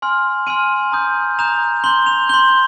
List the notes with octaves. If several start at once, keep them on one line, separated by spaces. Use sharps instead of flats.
G#5 C6 F6
G#5 C6 F6 D#7
A#5 D#6 G6
A#5 D#6 G6 F7
C6 G6 G7
F7
C6 G6 G7